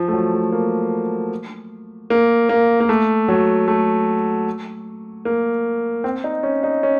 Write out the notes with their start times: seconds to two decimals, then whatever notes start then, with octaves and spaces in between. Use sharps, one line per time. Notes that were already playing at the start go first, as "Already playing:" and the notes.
Already playing: F3
0.08 A3
0.13 F#3
0.33 A3
0.52 A#3
2.10 A#3
2.49 A#3
2.80 A#3
2.89 A3
3.28 F#3
3.68 A3
5.25 A#3
6.04 C4
6.24 D#4
6.43 C#4
6.63 D#4
6.83 C#4